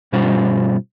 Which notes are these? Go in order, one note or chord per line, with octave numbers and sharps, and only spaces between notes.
G2 B2 G3 C#4 F4 C5